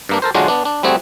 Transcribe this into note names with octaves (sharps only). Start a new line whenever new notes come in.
G2 A#3 D4
A4 A#4 C5
D3 F#3 G#3 D4 F4 F#4
B3 D4
D4
G3 A3 C4 F#4 G#4